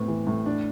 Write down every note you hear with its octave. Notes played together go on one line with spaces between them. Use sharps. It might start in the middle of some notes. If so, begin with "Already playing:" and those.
Already playing: A2 B3 C4
E3
A2
D4